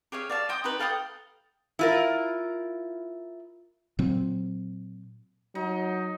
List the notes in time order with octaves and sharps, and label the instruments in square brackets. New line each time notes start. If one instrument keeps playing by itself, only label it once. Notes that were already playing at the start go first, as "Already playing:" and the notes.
[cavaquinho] G4 G#4 C#5 F5
D5 F5 A5
D#5 G5 C6 D#6
D#4 G4 B4
A4 F5 G5 D#6
[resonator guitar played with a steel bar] E4 F4 A#4
[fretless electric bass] A#2 F#3 C4
[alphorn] F#3 [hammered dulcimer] D#4